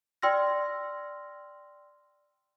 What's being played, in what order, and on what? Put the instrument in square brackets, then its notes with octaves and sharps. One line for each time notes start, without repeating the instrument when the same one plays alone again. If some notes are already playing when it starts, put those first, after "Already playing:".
[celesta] D5 G5 C6 E6 F6 A#6